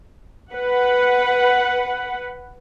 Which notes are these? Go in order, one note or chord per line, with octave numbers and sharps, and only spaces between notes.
B4 F#5